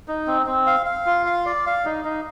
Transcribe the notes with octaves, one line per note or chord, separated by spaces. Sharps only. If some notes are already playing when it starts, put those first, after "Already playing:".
D#4
C4
C4
F5
F5
F4
F5
D5
F5
D#4
D#4